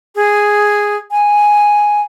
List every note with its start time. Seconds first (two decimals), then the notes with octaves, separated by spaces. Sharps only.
0.15 G#4
1.11 G#5